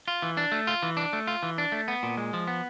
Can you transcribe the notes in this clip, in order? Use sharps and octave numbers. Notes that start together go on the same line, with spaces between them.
F4
E3
D4
A3
F4
E3
D4
A3
F4
E3
D4
A3
B3
A#2
G#3
F3
B3